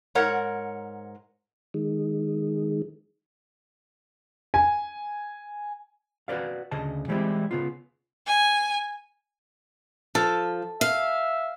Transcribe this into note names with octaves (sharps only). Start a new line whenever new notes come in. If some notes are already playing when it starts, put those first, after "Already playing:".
G#2 A#4 C#5 F#5
D#3 G#3
G#5
F#4 B4 C5 D5 F5
D2 C#3 D#5 A5
E3 G3 G#3 C4 E4 G4
C#3 B3 F4
G#5
F3 A4
E5 F5